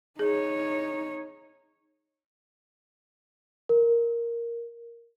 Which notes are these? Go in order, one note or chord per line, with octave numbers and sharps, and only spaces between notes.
D#4 G#4 C#5
A#4